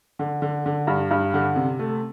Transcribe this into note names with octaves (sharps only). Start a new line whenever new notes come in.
D3
D3
D3
G2
G2
D3
C3
A3